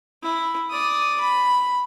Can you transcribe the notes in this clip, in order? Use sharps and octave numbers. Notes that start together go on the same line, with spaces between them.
E4
D5 D#6
B5